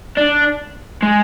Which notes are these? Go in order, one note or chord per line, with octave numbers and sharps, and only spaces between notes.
D4
G#3